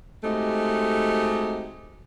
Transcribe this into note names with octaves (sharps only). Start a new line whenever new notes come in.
G#3 A3 C4 D#4 F#4 G4